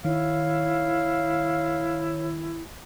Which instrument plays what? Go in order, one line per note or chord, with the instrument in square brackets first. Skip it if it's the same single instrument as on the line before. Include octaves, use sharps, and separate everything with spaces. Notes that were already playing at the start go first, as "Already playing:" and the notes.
[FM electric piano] D#3 [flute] E4 [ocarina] C#5 [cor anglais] F5